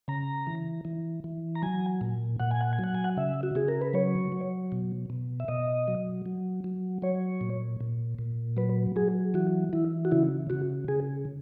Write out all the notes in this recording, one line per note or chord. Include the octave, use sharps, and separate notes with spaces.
C#3 A#5
E3
E3
E3
A#5
F#3 G#5
A#2
A#2 F#5
G#5
F#5
G#5
F#3
F#5
G#5
F#5
C#3 E5
F#4
C#3 G#4
A#4
B4
F#3 C#5
F#3
B2
B2
E5
B2 D#5
F#3
F#3
F#3
F#3 C#5
A#2
A#2
A#2
F#3 B4
F#3 G#4
E3 F#4
E3 E4
F#4
C#3 E4
C#3 F#4
C#3 G#4